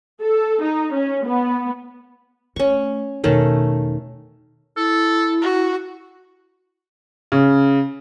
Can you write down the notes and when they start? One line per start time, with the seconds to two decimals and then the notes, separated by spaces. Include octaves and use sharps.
0.21 A4
0.63 D#4
0.92 C#4
1.25 B3
2.56 A3 C#4 C#6
3.24 E2 B2 D#3 A3 C#4
4.77 E4 A4
5.42 F#4
7.32 C#3